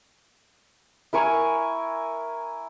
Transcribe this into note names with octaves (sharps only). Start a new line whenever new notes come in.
E4 A#4 G#5 C#6